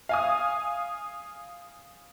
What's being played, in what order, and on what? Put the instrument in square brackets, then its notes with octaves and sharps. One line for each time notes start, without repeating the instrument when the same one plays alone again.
[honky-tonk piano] F5 G#5 D#6